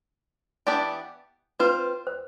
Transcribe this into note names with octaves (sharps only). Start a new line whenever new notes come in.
E3 B3 D4 G4 D5
C4 F4 B4 C5
C5